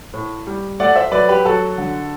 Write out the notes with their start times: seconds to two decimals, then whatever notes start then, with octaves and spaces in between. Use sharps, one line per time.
0.14 A2
0.47 G3
0.80 A3 D5 F#5
0.95 C5 E5
1.12 F#3 B4 D5
1.29 G4 B4
1.45 F#3 F#4 A4
1.78 D3